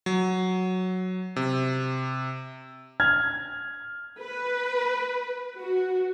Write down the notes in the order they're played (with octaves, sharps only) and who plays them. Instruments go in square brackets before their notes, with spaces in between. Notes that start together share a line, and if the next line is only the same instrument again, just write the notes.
[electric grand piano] F#3
C3
[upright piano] F6 G#6
[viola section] B4
F#4